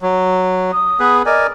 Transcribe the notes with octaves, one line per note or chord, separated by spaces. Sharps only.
F#3
D#6
B3 G#4 B4
A#4 D5 D#5 G#5